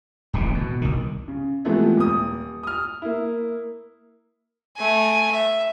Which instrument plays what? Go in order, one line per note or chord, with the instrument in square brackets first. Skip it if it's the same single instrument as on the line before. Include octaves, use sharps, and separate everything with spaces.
[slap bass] D1 G#1 B2 E3
B2
C2 D#3
[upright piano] C#3
C3 E3 F3 G#3 A3 B3
D#1 D#6
D#6 F6
A#3 E4
[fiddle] A3 G#5
E5